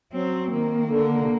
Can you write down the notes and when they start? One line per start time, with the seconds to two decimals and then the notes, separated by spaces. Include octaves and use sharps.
0.13 F#3 C4
0.51 D#3 A#3
0.88 D3
1.20 C3